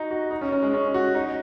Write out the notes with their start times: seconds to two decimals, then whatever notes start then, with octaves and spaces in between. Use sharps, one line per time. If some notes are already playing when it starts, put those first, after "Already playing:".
Already playing: D#4 F#4
0.11 F#4
0.31 D#4
0.41 C#4
0.52 C#4
0.62 G#3
0.74 C#4
0.94 F#4
1.15 D#4